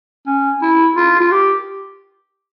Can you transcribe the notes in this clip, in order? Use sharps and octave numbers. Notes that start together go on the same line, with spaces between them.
C#4
E4
F4
F4
G4